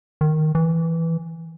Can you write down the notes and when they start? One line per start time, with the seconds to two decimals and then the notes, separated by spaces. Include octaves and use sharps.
0.21 D#3
0.55 E3